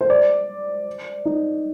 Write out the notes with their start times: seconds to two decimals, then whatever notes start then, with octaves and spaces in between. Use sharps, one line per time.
0.01 C5
0.10 D5
1.25 D#4